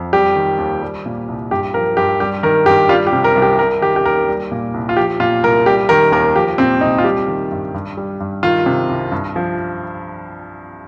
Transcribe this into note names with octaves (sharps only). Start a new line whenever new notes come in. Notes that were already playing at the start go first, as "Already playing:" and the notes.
Already playing: F2
G3 G4
D#3
D#2
G3
A#2
C2
G2 G4
F3 A#4
G2 G4
G3 G4
D#3 A#4
G2 G4
G3 F4
G4
C3
A#4
C2
G4
G3 A#4
D#3 G4
G4
D#2 A#4
G3
A#2
C2
F4
F3 G4
A#2 F4
C2 A#4
G3 G4
D#3 A#4
D#2 A#4
F3 G4
A#2 C4
C2 D#4
F4
G3 G4
D#3
G2
G2
G3
G2
D#3 F4
C3
C2
G2
F3